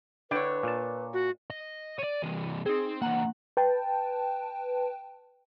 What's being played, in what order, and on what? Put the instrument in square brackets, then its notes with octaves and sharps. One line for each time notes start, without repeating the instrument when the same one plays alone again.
[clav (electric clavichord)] D3 E4 G5 [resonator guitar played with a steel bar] D4 C#5 [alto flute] B4
[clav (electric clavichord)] A#2 A5
[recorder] F#4
[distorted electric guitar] D#5
[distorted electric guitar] C#5 D5 [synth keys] D#7
[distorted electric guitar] C3 E3
[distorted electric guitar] C4 [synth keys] D#4 G#4
[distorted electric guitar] E3 A#3 [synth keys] F#5 A#5
[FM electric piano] B4 G5 A5